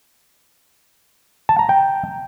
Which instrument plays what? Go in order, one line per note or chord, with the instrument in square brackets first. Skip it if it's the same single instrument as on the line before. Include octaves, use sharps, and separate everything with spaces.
[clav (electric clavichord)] A5
A#5
G5